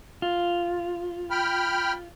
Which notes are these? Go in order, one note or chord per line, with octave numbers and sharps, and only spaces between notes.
F4
G5 B5 F6